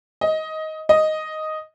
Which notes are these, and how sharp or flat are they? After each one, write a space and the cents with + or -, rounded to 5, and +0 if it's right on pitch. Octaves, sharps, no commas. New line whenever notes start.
D#5 +15
D#5 +0